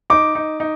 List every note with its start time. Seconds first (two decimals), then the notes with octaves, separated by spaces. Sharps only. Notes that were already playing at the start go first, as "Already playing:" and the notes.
0.10 D#4 D6
0.35 D#4
0.60 D#4